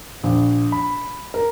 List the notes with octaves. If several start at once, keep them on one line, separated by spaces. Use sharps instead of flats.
A#1
B5
A#4